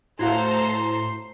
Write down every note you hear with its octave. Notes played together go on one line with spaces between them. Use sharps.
A2 E4 F#4 A4 C5 F5 A#5 C6